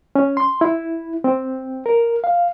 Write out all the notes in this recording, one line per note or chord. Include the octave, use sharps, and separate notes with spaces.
C#4
C6
E4
C4
A#4
F5